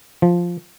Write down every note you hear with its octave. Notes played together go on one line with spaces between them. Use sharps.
F3